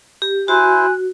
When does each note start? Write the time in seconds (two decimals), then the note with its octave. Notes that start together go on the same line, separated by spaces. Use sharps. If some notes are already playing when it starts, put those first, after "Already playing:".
0.22 G4
0.48 E4 F#4 C5 G#5 F#6